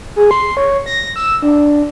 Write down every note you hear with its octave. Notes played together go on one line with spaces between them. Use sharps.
G#4
C6
C#5
A#6
E6
D4